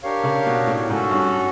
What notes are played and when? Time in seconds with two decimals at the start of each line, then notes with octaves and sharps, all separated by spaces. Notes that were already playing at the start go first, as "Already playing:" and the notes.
0.03 D4 G4 A#4 C#5 F5
0.24 C#3
0.46 B2
0.67 A2
0.89 G#2 C#4 F#4 A4
1.11 G2